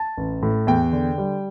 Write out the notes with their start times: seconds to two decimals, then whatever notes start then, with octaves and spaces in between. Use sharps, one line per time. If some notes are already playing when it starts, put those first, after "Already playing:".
Already playing: A5
0.17 A1
0.43 A2
0.67 E2 G5
0.92 D3
1.18 G3